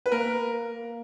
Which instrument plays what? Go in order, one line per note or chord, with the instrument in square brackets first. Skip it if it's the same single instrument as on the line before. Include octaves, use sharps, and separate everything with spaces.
[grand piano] B4
[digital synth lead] A#3 [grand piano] A#4
[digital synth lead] A#3